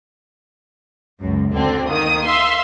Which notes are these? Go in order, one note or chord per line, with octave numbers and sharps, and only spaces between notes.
C#2 F#2
D2 D3 C4 D4
D#3 A#3 D#6
E5 F5 C6